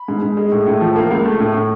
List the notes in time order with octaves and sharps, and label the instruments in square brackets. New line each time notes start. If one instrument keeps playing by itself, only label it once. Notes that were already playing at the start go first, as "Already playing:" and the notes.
Already playing: [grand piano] B5
G#2
G#2
G#3
A2
A2
F3
A#3
C#2
A3
A2
A2